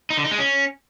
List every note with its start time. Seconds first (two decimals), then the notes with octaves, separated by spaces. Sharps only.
0.10 D#4
0.17 D3
0.24 D#4
0.31 G#3
0.38 C#4